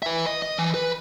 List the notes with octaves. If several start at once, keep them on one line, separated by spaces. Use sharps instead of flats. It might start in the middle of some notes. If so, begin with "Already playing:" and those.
B4 E5
D#5
D#5
E3
B4